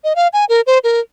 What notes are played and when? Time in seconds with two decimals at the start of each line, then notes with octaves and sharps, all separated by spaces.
0.04 D#5
0.16 F5
0.33 G#5
0.49 A#4
0.67 C5
0.84 A#4